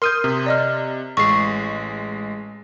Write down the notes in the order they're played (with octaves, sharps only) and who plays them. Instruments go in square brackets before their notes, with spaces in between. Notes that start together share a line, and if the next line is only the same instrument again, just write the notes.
[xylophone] A#4 F6 D#7 [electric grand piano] C6 D#6 G6
[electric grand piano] C3
[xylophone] D5 D#5 F6
[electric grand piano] A1 G#3 [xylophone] C#6 C7